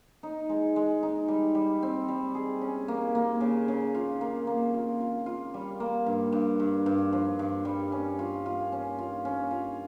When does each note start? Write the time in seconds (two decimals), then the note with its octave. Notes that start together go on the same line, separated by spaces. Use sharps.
0.23 D#4
0.49 G#3
0.76 G#3
1.03 D#4
1.28 G3
1.55 G3
1.83 C4
2.08 G3
2.34 G#4
2.61 C#4
2.88 A#3
3.15 A#3
3.41 C#3
3.68 C#3
3.95 F4
4.21 A#3
4.47 A#3
4.74 F4
5.00 F4
5.26 F4
5.54 G3
5.80 A#3
6.06 G2
6.32 G2
6.60 G2
6.86 G2
7.13 F3
7.39 G2
7.65 G3
7.92 C#4
8.19 F4
8.46 F4
8.72 C#4
8.98 F4
9.25 C#4
9.51 F4